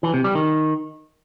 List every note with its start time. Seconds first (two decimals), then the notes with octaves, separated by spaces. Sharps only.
0.03 E3
0.14 C3
0.24 G3
0.35 D#3